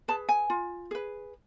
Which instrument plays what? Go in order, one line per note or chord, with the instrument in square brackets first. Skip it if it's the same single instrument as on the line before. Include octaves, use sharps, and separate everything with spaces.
[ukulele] G#4 B4 A5
G#5
F4
G#4 B4